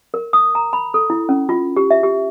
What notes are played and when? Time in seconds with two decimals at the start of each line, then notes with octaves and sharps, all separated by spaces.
0.14 A#4
0.33 D#6
0.55 A#5
0.73 B5
0.94 A4
1.10 E4
1.29 C#4
1.49 F4
1.76 G4
1.91 E5
2.03 G4